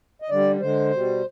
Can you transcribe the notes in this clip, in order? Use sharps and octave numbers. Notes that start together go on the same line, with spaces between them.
D#5
D3 G3 D5
D3 G#3 C5
B2 G3